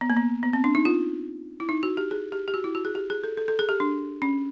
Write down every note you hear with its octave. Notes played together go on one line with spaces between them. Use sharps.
B3
A#3
B3
B3
C4
D4
D#4
F4
E4
D#4
F#4
G4
G#4
G4
G4
F#4
E4
F#4
G#4
G4
G#4
A4
A4
A4
G#4
G4
D4
C#4